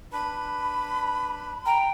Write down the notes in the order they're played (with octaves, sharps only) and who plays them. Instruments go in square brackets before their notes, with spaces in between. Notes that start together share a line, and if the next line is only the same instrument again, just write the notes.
[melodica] D4 B4 [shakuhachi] B5
[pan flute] G5 [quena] A#5